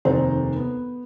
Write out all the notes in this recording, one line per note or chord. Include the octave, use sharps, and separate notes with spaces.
F1 D#2 C3 A4 C5 A#5
B3